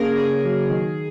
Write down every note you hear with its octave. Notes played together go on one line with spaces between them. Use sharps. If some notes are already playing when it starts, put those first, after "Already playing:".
Already playing: C#3 A#3 G#4 A#4
C#3 G#4
F#3
D#3